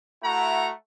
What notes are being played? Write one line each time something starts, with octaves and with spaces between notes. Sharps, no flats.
A3 E4 F#4 F#5 A#5